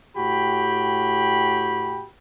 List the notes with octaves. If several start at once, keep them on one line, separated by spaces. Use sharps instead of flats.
A2 F#4 G4 G5 B5